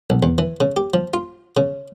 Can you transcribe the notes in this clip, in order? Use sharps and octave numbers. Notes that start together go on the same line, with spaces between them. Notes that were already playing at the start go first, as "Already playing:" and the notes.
B1
E2
E3
C#3
G4
F3
F4
C#3